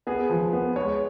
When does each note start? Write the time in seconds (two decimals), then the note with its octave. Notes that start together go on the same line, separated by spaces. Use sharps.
0.07 B3 G#4
0.30 F3
0.53 B3
0.76 G#3 C#5